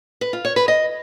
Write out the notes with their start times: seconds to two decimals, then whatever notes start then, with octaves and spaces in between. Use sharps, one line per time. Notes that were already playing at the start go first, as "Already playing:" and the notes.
0.21 B4
0.33 F4
0.45 C#5
0.56 B4
0.68 D#5